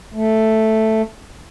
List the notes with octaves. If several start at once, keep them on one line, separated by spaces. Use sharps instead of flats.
A3